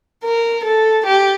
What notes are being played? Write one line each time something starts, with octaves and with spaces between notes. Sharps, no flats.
A#4
A4
G4